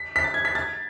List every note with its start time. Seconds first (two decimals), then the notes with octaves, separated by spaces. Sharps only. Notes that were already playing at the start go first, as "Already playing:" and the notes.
Already playing: B6
0.16 B6
0.24 A6
0.34 G#6
0.45 B6
0.55 A6